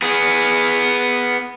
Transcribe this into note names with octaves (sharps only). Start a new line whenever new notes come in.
B3 G#4